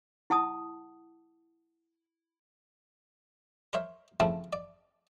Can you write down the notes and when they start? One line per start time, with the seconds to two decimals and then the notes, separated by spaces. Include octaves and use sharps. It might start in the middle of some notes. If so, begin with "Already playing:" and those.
0.30 E4 F#5 A5 D#6
3.73 A#4 C5 C#5 E5
4.20 C#3 F3 A3 C4 E4
4.53 D5